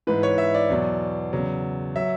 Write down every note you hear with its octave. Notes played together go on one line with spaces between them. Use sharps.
G#2 E3 B4
C#5
E5
D5
E2 B2 F#3
E2 C#3 F#3
F#3 E5